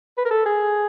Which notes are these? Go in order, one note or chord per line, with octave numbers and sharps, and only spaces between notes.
B4
A#4
A4
G#4